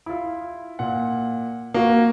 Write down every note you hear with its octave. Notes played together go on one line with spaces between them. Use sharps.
E4 F4
A#2 F#5
A#3 F#4